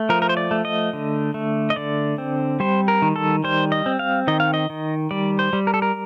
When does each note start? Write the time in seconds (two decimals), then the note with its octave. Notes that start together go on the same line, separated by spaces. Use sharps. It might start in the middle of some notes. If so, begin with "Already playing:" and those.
Already playing: A3
0.09 F3 A#4
0.22 A#4
0.29 C5
0.37 D5
0.51 A3
0.65 D#5
0.93 D3
1.34 A3
1.70 D#5
1.76 D3 D5
2.18 C4
2.60 G3 C5
2.88 A#4
3.02 D#3
3.16 A4
3.44 G3 C5
3.72 D#5
3.86 C4
3.99 F5
4.27 D#3 D#5
4.40 F5
4.54 D#5
4.70 D#3
5.11 G3 D5
5.39 C5
5.53 G3
5.67 A#4
5.74 A4
5.82 A#4